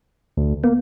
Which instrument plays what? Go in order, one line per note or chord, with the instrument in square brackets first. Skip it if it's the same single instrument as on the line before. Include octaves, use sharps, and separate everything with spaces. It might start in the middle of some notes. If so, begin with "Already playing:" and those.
[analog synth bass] D2
[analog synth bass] A#3 [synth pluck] B3